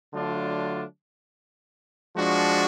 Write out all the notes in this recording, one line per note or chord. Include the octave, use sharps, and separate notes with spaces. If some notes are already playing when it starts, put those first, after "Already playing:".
D3 F#3 A3 D4 F4
F3 G#3 D4 F#4